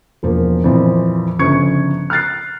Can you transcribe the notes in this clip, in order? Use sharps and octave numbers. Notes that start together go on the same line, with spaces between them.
E1 F3 A#3
F2 A#2 E3 F3
G1 C#3 F3 C#6 G#6 C#7
F6 F#6 A6 C7